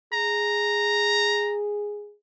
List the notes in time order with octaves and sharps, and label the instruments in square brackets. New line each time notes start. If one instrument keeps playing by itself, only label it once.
[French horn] G#4 [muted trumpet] A#5